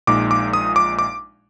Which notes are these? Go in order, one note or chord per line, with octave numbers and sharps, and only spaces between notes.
A#1 A#2 G#3 D#4 D6
D6
D#6
D6
D6